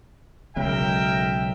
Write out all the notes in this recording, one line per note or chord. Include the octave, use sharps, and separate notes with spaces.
B1 C#3 G#3 A#4 E5 G5